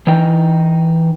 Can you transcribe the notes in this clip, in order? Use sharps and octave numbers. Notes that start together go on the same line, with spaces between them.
E3 D#4 G5